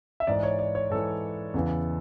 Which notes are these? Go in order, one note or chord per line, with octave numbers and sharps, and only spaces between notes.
E5
G#2 E3 D5
C#5
D5
C#5
G#2 E3 A4
E2 C#3 E3